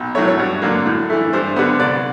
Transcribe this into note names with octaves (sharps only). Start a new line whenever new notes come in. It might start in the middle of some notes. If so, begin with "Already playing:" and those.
Already playing: B1
A2 F#3 A3 C#5
C#5
G2
D3 F#3 A#3
A2
E3 A3
G2 C5
D3 G3 B3
C2 D5